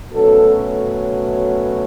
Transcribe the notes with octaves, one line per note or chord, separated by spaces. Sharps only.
B2 F#3 A3 C#4 A4